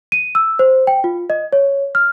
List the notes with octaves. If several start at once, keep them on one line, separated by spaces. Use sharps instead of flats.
D#7
E6
C5
G5
F4
D#5
C#5
F6